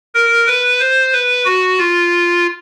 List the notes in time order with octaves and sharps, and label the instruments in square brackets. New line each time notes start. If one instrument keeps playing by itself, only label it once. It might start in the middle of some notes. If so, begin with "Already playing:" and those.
[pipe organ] A#4
B4
C5
B4
F#4
F4